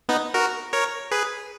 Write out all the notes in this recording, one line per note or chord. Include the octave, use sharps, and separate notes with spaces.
B3 D#4
F#4 A#4
A#4 C#5
G#4 B4